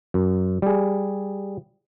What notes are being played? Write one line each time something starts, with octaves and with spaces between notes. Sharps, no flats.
F#2
G3 G#4